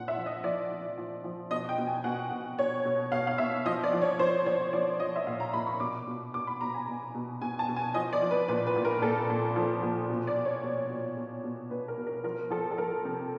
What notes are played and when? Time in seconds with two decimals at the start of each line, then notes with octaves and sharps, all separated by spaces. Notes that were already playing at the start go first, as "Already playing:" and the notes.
Already playing: A#2 F3 F#5
0.08 E5
0.16 F3
0.26 D#5
0.44 F3 D5
0.71 F3
0.98 F3
1.24 F3
1.51 B2 D#5
1.69 G5
1.78 B2
1.87 G#5
2.04 B2 F#5
2.31 B2
2.58 B2 C#5
2.85 B2
3.12 B2 F5
3.27 F5
3.38 B2 E5
3.66 F3 D#5
3.83 D5
3.93 F3
4.02 C#5
4.19 F3 C5
4.46 F3 C#5
4.73 F3 D5
5.00 F3 D#5
5.16 E5
5.26 A#2 F5
5.40 A#5
5.53 A#2 B5
5.66 C#6
5.80 B2 D6
6.07 B2
6.34 B2 D6
6.47 B5
6.60 B2 A#5
6.74 G#5
6.88 B2
7.14 B2
7.41 B2 G#5
7.59 A5
7.68 B2
7.76 G#5
7.94 F3 D#5
8.13 D5
8.22 F3
8.31 B4
8.48 A#2 B4
8.66 B4
8.76 A#2
8.85 A#4
9.02 A#2 A4
9.30 A#2
9.56 F3
9.83 A#2
10.09 B2
10.27 D5
10.36 B2
10.45 C#5
10.63 B2
10.90 B2
11.17 B2
11.44 B2
11.71 B2 B4
11.88 A#4
11.97 B2
12.07 A#4
12.24 F3 A#4
12.50 F3 A4
12.71 A4
12.78 F3 A#4
13.05 C3